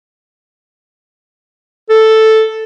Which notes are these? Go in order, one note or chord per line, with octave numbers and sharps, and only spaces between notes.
A4